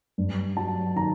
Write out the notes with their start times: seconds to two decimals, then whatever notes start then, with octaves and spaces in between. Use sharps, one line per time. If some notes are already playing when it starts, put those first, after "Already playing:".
0.18 G2
0.57 F#3 A5
0.96 D#3 A#5